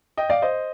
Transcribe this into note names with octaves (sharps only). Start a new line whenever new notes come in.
D#5 G5
D5 F5
C5 D#5